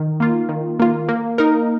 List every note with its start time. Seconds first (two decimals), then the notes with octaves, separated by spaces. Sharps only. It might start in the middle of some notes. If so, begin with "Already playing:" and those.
Already playing: D#3
0.20 A#3 F4
0.49 D#3
0.79 A#3 F4
1.09 A#3
1.38 D#4 A#4